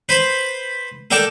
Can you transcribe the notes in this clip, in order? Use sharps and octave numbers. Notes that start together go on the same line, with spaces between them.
B4 C5 B5
A4 A#4 D5 G5 A5